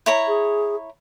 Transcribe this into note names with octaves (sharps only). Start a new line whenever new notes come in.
E4 C#5 A#5
G#4